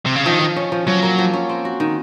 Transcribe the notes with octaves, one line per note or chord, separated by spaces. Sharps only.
C3
C#3
D#3 F3
F3
C#4
F3
F3 F#3
A#3
F3
C#4
C4
F#4
D#3